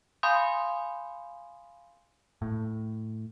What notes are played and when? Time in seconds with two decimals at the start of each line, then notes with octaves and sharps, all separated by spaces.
0.23 F5 G#5 B5 C6 D#6 G6
2.42 A2